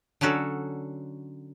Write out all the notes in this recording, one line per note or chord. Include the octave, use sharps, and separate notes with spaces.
D3 F#3 C#4 F#4 A4